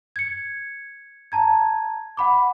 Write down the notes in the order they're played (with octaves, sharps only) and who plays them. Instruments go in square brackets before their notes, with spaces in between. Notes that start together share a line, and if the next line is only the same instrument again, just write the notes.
[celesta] G#6 C#7
A5 A#5 G#6
F#5 B5 D6